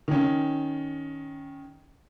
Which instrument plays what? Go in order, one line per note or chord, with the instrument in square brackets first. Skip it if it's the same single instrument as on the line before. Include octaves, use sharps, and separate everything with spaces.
[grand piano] D#3 C#4